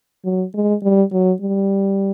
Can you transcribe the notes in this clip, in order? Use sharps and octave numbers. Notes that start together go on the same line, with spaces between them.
F#3
G#3
G3
F#3
G3